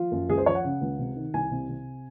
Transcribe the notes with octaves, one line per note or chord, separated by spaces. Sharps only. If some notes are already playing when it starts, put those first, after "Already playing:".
Already playing: F3 F4
F#2
C#2 G#4
C5
F3 C#5
F#5
C#3
C#2
C3
D#3
C2 G#5
C3
C3